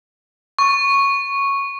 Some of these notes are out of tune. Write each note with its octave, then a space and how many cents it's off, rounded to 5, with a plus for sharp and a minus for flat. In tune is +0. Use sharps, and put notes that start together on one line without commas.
C#6 -5